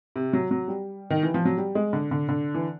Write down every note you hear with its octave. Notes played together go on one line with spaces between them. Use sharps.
C3
F#3
F#3
G3
D#3
E3
F3
F#3
G3
G#3
D3
D3
D3
E3